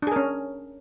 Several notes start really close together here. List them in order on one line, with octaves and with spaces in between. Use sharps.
D4 G#4 A#4 C#4